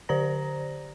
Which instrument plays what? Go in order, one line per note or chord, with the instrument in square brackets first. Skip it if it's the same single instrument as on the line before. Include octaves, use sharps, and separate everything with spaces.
[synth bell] D3 G4 C5 D5 A#5 A#6